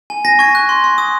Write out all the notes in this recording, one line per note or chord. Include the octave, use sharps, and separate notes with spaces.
G#5
G#5 A#6
C#6 G#6
F#6
C6
C6
D#6